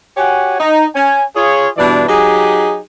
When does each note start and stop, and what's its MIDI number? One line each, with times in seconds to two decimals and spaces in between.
0.17 0.55 66
0.17 0.55 67
0.17 0.55 73
0.17 0.55 78
0.17 0.55 80
0.59 0.85 63
0.95 1.22 61
0.95 1.22 80
1.35 1.68 65
1.35 1.68 68
1.35 1.68 73
1.77 2.05 43
1.77 2.05 47
1.77 2.05 52
1.77 2.05 62
1.77 2.05 74
2.08 2.79 54
2.08 2.79 63
2.08 2.79 67
2.08 2.79 68